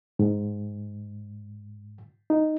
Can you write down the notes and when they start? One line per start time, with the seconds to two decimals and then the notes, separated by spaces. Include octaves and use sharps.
0.19 G#2
2.30 D#4